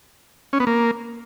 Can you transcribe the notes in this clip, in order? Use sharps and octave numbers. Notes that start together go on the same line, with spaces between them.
C#4
B3
A#3